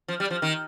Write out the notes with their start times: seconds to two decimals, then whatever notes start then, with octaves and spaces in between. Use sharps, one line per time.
0.08 F3
0.20 G3
0.31 F3
0.42 D#3